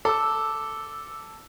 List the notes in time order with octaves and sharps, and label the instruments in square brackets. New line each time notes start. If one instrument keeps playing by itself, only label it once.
[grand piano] A4 [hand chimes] D6 E6